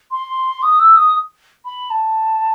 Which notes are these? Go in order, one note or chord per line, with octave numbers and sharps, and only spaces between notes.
C6
D#6
E6
D#6
B5
A5